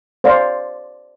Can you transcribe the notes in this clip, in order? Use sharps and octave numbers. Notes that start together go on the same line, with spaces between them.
C5 D5 F5 C6